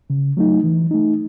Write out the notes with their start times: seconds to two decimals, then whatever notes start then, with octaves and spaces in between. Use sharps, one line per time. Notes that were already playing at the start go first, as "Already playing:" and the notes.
0.10 C#3
0.37 F#3 A3 D#4
0.64 E3
0.91 A3 D#4